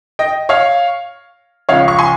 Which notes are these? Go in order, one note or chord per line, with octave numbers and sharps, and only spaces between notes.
D#5 G5
C#5 F5
C#2 C#3 F3 C#5 F5
C#6
G#5 C6